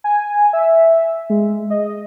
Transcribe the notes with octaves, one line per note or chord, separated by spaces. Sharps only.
G#5
E5
G#3
D#5